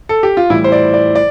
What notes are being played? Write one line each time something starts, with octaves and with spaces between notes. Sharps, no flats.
A4
G4
F4
A2 E3 G3 E4
C5
D5
D5
D5